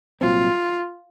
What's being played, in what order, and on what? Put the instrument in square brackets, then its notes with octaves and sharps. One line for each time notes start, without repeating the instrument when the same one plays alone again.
[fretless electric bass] C2 A#2 F#3 C4 [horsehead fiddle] F4